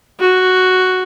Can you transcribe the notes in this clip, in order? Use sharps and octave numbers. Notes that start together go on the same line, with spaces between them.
F#4